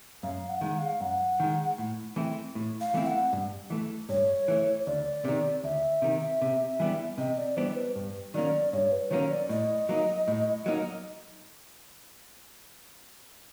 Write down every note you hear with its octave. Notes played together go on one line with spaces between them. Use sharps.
F#2 F5
F#5
D#3 G#3
F#5
F5
F#2 F#5
D#3 G#3
A2
E3 A3 C4 E4
A2
F5
E3 A3 C4 E4
F#5
G2
E3 A3
G2 C#5
E3 A3
D2 D5
C3 D#3
D2 E5
C3 D#3
C3
E3 G3 B3 D4
C3 D#5
D5
E3 G3 B3 D4 C5
B4
G2
D#3 F#3 A#3 C#4 D5
G2 C#5
B4
D#3 F#3 A#3 C#4 C#5
D5
A2 D#5
F#3 A#3 D#4
A2
F#3 A#3 D#4